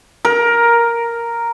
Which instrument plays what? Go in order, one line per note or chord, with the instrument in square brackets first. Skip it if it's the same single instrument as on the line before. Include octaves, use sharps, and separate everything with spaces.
[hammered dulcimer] A#4